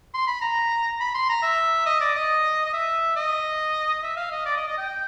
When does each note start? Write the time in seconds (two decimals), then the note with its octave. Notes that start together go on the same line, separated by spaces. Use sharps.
0.14 C6
0.27 B5
0.42 A#5
1.00 B5
1.15 C6
1.29 A#5
1.43 E5
1.86 D#5
2.01 D5
2.16 D#5
2.66 D#5
2.73 E5
3.16 D#5
4.03 E5
4.17 F5
4.31 D#5
4.45 D5
4.57 D#5
4.68 D#5
4.78 G5